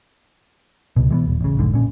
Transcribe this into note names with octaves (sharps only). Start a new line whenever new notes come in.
C#2 B2
E3 G#3 B3
D#1
A1 C#3
F1 B1 G#2 D3
A#2 C#4